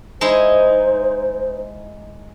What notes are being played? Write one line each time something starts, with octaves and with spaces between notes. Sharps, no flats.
G#3 D#4 E4 C5